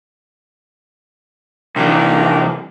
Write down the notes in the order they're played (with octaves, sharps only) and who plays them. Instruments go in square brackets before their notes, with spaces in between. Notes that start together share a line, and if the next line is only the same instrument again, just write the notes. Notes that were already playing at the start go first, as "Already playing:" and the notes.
[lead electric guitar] C2 E3 [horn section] D#3 A#3 D4